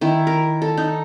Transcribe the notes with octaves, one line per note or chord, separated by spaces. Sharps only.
D#3 E4
A#4
A4
D#4